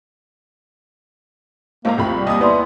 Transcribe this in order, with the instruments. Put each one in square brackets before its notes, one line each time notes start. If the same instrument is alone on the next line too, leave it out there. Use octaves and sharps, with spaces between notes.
[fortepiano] G#1 A2 [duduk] A#3 [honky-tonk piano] C5 A#5
[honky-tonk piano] C2 B5 C#6 [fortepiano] F3 [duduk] C4
[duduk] G3
[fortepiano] D#2 [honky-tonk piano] D#5 D#6
[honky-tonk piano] B3 [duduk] E4 [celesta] B4 D5 C6